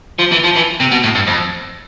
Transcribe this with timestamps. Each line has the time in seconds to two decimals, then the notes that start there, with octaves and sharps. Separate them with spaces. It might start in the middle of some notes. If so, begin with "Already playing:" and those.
0.19 F3
0.31 E3
0.44 F3
0.55 E3
0.80 C3
0.91 B2
1.04 A2
1.15 G2
1.27 F2